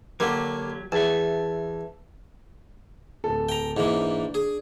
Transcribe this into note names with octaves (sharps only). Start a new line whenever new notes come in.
D3 F#3 A#3 G4
E2 E5 A5
D1 A4
G5 A#5
G#2 E3 A#3
D4
G#4